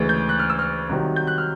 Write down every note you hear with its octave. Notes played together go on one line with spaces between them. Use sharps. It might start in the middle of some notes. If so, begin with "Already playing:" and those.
Already playing: D2 C#3 E3 G#3
G6
F#6
F6
E6
F6
C2 C3 D#3 F#3
G6
F#6
F6